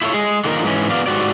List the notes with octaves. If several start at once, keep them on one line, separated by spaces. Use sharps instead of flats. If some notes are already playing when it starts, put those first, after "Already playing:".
E4 F4 A4 B4 C#5
G#3 G#4
D3 D#3 F3 A#3 D#4 A#4
G#2 E3 C#4
F#3 B3 D5 F5
G#2 E3 F#4 G4 D5